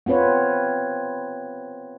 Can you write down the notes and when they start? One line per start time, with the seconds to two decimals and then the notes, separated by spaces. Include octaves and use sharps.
0.06 B3 C4 F4 B4 C#5